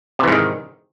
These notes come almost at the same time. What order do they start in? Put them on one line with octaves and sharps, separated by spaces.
C3 E3 G#2 D#3